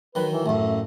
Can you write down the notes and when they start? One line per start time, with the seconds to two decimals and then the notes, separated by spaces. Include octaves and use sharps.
0.15 D#3 F#3 B4
0.31 E3
0.46 A1 F#2 A3